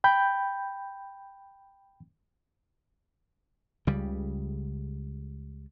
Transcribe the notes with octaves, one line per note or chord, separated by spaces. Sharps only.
G5 B5 G6
C#2 C#3 G3